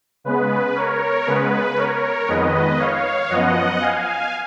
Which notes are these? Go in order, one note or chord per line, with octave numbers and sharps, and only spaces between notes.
C#3 G#3 B3 B4
A#4 C#5
C#3 G#3 B3 B4
A#4 C#5
F2 D#3 G#3 B3 B4 D#5
C#5 F5
F#2 F3 B3 D#5 F#5
F5 G#5